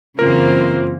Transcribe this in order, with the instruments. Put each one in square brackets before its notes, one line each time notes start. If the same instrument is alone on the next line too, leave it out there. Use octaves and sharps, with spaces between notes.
[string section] F#2 E3 A#3 [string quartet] C#3 C4 C5 [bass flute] F4 [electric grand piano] A#4